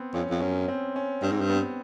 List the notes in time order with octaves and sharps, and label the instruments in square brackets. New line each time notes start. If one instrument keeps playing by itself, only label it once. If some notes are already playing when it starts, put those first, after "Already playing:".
Already playing: [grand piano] B3 C4
[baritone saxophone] F2 [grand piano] C#4
[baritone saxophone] F2
[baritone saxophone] F#2 [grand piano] C#4
[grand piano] C4
C#4
[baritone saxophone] G2 [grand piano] C4
[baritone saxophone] G#2
G2
[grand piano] B3